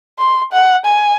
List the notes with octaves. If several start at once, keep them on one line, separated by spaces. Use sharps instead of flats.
C6
F#5
G#5